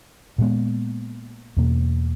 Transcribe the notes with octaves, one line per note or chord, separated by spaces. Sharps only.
A#2 G#3 B3
E2 B2 A#3